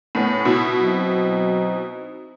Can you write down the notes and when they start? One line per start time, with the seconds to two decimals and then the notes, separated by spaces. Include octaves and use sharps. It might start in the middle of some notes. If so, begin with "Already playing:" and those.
0.15 A2 B3 C#4
0.45 B2 E4
0.81 F#3 C4 D#4